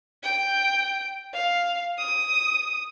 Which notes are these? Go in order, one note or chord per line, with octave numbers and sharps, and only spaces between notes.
G5
F5
D#6